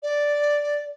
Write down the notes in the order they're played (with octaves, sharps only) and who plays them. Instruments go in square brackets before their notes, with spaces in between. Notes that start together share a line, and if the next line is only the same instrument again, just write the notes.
[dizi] D5